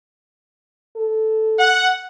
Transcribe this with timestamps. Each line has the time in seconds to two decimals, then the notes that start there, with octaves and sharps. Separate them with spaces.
0.97 A4
1.59 F#5